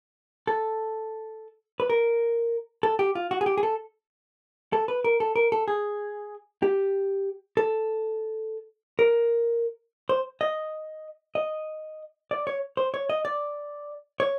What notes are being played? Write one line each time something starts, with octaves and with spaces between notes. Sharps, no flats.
A4
B4
A#4
A4
G4
F4
F#4
G#4
G4
G#4
A4
A4
B4
A#4
A4
A#4
A4
G#4
G4
A4
A#4
C5
D#5
D#5
D5
C#5
C5
C#5
D#5
D5
C#5